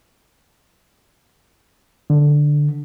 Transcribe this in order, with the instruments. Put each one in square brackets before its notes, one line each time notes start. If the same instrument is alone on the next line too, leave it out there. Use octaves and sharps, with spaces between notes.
[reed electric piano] D3